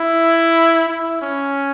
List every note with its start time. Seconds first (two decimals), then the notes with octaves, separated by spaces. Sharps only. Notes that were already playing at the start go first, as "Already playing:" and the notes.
Already playing: E4
0.89 E4
1.22 C#4